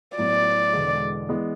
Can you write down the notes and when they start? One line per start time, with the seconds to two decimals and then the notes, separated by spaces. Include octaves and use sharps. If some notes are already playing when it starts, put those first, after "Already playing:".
0.17 A2 F#3 B3 D5
0.73 E1 E2 D3 G#3
1.29 E3 G#3 B3